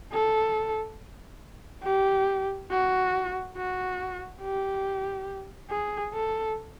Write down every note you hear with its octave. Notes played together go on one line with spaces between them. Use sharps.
A4
G4
F#4
F#4
G4
G#4
A4